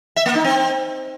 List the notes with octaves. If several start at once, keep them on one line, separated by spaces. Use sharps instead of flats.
E5
A#3
D#4
C4